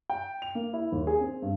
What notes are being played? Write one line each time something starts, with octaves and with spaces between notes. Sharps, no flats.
G5
F7
A#3
E4
D#2
G#4
C4
G2